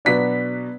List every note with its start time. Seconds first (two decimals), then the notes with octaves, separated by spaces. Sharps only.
0.05 B2 F#3 B3 D4 B6